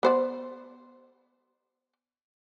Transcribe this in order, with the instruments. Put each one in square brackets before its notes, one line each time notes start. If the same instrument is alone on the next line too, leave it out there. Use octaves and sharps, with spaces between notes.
[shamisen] B3 C5 D5